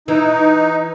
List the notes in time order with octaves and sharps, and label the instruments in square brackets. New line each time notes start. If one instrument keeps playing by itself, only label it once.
[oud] E3 [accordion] D#4